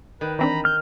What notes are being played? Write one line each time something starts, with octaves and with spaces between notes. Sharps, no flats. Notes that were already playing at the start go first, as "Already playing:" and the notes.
D#3 B4
E3 C4 D4 A#5 B5
F6 G6